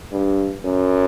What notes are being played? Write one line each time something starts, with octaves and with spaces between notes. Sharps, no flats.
G2
F#2